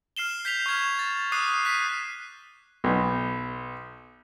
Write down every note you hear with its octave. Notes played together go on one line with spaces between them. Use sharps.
F6 C7 E7 G7
G6 B6 E7 F7
C#6 F6 G#6 E7
A6
D6 D#6 F#6 C7 D#7
F#6 B6 D#7
B1